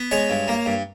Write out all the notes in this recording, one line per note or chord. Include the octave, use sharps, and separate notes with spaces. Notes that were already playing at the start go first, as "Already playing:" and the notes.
Already playing: B3
G#3 C#5
G2
A#3
G2